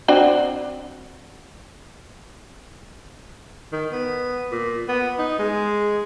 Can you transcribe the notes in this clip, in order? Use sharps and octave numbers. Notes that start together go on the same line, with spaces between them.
C4 D4 F#4
D#3
B3
A#2
B3
D#4
G#3